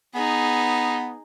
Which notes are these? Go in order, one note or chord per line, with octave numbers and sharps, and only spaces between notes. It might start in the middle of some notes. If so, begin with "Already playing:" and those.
B3 D#4 G#4